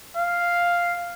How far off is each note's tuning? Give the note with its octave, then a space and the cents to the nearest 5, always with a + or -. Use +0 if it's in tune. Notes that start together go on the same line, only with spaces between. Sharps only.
F5 +0